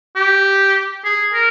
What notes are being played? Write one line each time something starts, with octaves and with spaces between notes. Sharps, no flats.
G4
G#4
A#4